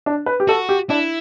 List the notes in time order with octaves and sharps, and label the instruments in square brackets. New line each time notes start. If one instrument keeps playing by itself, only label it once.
[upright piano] D4
B4
G4
[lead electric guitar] F#4 [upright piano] A4
[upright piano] G4
[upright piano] D4 [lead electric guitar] E4